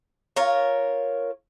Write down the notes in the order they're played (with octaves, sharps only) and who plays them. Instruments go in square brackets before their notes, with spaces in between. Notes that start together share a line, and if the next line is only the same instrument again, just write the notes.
[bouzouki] F4 A#4 C#5